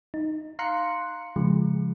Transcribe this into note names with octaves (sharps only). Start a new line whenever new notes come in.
D#4
F5 A#5 C6 F#6 C#7
C#3 F3 G#3